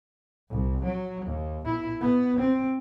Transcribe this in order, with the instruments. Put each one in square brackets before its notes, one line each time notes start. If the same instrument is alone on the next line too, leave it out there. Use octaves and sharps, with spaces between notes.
[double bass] C2
F#3
D#2
B2 E4
B3
C4